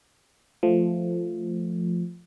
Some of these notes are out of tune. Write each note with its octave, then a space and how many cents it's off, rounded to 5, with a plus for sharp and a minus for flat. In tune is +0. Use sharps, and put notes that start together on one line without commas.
F3 +0 A3 +0